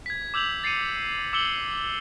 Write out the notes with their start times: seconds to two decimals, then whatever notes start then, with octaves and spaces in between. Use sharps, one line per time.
0.06 G#6 B6
0.34 D6 E6 G6 F7 F#7
0.64 A6 C7 C#7 D#7
1.33 D6 E6 C#7 F#7 G7